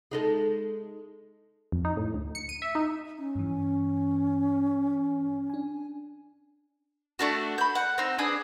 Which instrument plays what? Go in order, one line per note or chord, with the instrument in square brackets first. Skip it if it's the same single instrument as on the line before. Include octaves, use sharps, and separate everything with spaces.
[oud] G#3 D#4 A4
[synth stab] F2
D#4
A2
D2
C#7
D#7
E5
D#4
[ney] C#4
[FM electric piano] G2 E3
D4 G#5
[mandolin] A3 D4 F#4
B5 G6
F#5
C4 D#4
D4 G#4 B4 D#6